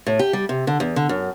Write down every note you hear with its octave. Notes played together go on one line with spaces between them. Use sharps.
A2
G4
G3
C3
D3
E2
D3
F#2